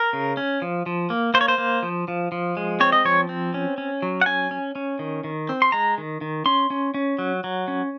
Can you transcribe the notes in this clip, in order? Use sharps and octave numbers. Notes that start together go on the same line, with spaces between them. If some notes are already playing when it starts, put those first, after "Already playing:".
Already playing: A#4
C#3
C#4
F3
F3
A#3
A#3 C5
C#5
C5
A#3
F3
F3
F3
G#3
C4 C#5
D#5
F3 C#5
C4
C#4
C#4
F#3
F#5
C#4 G#5
C#4
C#4
D#3
D#3
C4
C6
G#3 A#5
D#3
D#3
C#4 C6
C#4
C#4
F#3
F#3
C#4